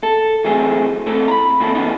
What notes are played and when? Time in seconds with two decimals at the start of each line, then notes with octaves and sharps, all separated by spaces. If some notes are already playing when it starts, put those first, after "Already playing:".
0.03 A4
0.44 E3 F#3 A3 C4 G#4
1.06 A2 C4 A4
1.28 A#5 B5
1.60 A#2 E3 C4 E4 A4
1.75 E2 B2 G#3 B3 C#4 D#4